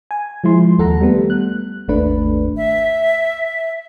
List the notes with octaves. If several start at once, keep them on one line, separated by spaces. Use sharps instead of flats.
G#5
F3 G#3 E4 C6
D#2 A4 F#5 A#5
G3 A3 B3
F#6
G#1 D#2 A3 D4 B4
E5